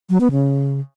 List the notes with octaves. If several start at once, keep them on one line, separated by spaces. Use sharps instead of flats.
F#3
B3
C#3